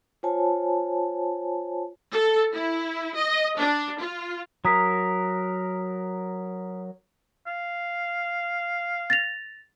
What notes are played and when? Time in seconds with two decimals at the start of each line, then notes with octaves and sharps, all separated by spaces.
0.23 F4 C5 C#5 G#5 A5
2.12 A4
2.53 E4
3.14 D#5
3.58 D4
3.99 F4
4.65 F#3 A#4 A#5 D#6 B6
7.47 F5
9.10 A6 A#6 F7